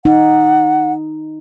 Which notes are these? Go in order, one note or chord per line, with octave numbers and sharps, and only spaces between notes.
D#4 F#5